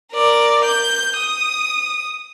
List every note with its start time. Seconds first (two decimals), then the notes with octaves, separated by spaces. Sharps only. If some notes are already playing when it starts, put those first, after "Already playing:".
0.13 A#4 D5
0.64 G6
1.16 D#6